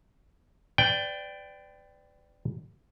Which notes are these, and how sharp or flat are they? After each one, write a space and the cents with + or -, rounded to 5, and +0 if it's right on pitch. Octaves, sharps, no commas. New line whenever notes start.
B4 +40 D5 +0 G5 +0